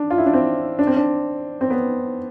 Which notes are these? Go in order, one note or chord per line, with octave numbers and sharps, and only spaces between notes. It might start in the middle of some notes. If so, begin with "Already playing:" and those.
Already playing: D4
F4
E4
D4
C4
D4
C4
D4
C4
B3